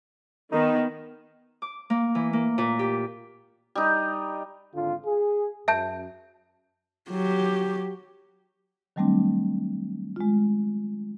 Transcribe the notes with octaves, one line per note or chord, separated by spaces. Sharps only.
D#3 B3 D#4
D6
A#3
E3
A#3
A#2
G4
G3 D#4
G#1 D3 F4
G#4
F#2 E5 A5 G6
F#3 G4
D#3 F#3 G3 A3 C4 D4
G#3 F4